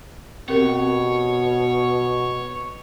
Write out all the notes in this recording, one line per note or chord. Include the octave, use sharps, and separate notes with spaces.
B2 C4 G4 A#4 C#5